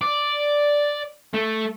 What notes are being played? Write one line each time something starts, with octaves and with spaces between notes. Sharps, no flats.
D5
A3